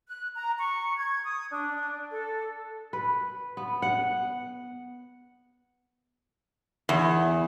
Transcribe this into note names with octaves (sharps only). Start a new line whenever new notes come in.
F#6
A#5
C#6
G#6
D#6
D4
A4
B4
B3
F#5
E2